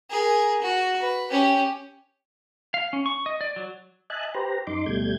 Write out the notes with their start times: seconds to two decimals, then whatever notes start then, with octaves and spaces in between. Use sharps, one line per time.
0.10 G#4 A#4
0.62 F#4
1.01 B4
1.31 C#4 G4
2.74 F5
2.93 C#4
3.06 C#6
3.26 D#5
3.41 D5
3.56 F#3
4.10 D#5 E5 G#5 A5 F#6
4.34 G4 B4 C5 A#5
4.67 F#2 D#4 C6 D6
4.86 D2 B2 G3 A3 G6 G#6